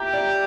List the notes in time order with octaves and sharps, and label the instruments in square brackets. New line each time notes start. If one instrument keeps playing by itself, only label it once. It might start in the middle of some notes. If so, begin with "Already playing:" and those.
Already playing: [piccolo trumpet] G4 [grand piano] E5 G5 A#5
[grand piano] D5